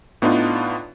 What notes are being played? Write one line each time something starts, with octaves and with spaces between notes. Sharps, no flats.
A2 B3 D4 D#4 F4